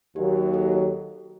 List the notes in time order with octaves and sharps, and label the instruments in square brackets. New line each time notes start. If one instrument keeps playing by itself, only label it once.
[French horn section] D#2 D#3 F#3 [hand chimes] G4
[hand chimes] G4 A4